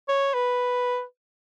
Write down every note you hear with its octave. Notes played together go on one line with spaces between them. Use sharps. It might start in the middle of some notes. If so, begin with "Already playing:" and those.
C#5
B4